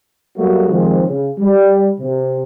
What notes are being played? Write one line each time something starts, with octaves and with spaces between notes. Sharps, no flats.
F#3 G3 A3 A#3 F#4
C3 D#3 F3 G#3 C4
C#3
G3
C3